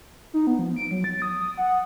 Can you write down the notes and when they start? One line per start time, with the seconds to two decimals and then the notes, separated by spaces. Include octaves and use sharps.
0.34 D#4
0.47 B3
0.59 F3
0.76 D7
0.91 F#3
1.04 A6
1.22 D#6
1.40 D#6
1.58 F#5